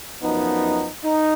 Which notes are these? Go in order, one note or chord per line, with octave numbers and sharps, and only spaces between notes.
F#2 F3 B3 D#4
D#4